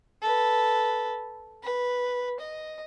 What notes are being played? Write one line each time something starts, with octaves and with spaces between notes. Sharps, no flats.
A4 B4
B4
D#5